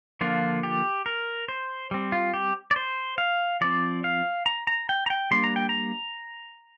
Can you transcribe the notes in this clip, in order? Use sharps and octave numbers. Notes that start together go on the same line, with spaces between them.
D3 F3 A#3 D4 F4
G4
A#4
C5
G3 C4
F4
G4
D5
C5
F5
F3 C4 D5
F5
A#5
A#5
G5
A#5
G5
G3 A#3 D4 C6
A#5
G5
A#5